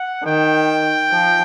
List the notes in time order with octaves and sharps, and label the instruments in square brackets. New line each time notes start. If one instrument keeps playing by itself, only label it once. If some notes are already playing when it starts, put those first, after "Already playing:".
Already playing: [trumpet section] F#5
[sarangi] D#3 [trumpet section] G5
[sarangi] F3